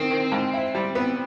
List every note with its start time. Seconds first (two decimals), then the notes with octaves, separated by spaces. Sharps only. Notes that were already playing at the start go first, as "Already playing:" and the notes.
Already playing: D#3 C4
0.10 D#3
0.32 G#2
0.53 E4
0.75 G3
0.95 B3